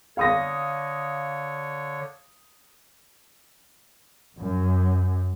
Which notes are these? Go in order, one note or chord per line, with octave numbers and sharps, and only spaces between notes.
D3 C#5 F5 D#6 A#6
F#2